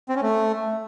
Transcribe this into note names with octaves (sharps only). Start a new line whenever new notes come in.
C4
C#4
A3